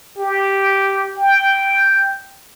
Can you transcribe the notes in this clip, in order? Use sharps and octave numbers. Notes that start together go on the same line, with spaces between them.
G4
G5